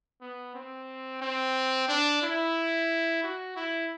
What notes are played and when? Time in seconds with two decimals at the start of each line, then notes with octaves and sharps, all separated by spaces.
0.21 B3
0.55 C4
1.22 C4
1.88 D4
2.23 E4
3.23 F#4
3.56 E4